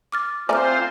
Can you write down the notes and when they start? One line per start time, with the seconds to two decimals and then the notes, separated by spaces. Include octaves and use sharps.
0.12 D6 F6 A6
0.49 A3 C4 F4 C5 D5 G#5 A#5 F6